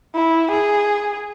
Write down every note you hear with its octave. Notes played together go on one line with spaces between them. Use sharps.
E4
G#4